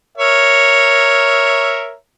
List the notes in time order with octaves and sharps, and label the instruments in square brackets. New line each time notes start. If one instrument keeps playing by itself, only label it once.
[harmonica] A#4 C#5 E5